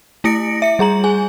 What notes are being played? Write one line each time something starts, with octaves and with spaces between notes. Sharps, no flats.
A3 E4 A#6 C#7 D7
E5 C#7
G3 G#4 A#5 F#7
G#4 G#5